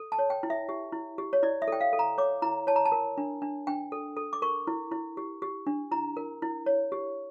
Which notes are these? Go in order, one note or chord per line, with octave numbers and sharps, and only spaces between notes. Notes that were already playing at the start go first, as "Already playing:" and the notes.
Already playing: A4
A5
C#5
G5
E4
E5
G4
E4
G4
C#5
E4 D5
E5
A4 G5
F5
A4
A#5
C#5 D6
E4 A#5
C#5 A5
A#5
A5
A#4
D4
D4
D4 G5
A4
A4
D6
A#4 C#6
E4
E4
G4
G4
D4
E4 A#5
A#4
E4
C#5
G4